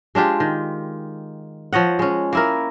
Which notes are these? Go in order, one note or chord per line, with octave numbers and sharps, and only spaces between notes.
G#3 D4 F4 G4
D#3
F3 C#5 D#5 F#5
G#3 C#4
A#3 E4 A#4